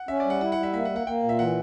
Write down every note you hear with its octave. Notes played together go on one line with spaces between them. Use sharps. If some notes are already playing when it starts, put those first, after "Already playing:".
Already playing: F#5
C#4 E5
D5
G3 F#5
E4 F#5
F#5
G3
E5
A#3 E5
F#5
A#3
F#5
A#3 G5
A#2
E5
E3 F#5